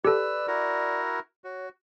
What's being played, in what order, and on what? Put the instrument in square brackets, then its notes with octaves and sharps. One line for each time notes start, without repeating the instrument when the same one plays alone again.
[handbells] G4 A4 [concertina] B4 E6 [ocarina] D5
[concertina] E4 F#4 A#4
[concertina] F#4 [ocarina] C#5